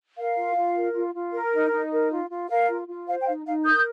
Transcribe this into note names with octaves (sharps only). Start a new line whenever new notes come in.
A#4 F5
F4
F4
A#4
F4
F4
A#4
D#4
D#4
A#4
F4
F4
A#4 F5
F4
F4
C5 F5
G5
D#4 F5
D#4 F5
A#4 D#6 G6